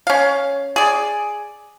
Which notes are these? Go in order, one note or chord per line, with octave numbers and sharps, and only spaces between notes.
C#4 F5
G#4 D5